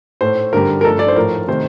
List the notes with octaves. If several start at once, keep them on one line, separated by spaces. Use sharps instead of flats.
A2 A3 C5
G2 D3 G3 A#4
A#4
G2 F3 A3 A4
D5
C5
A2 F3 A3 A#4
C3 D#3 A3 C5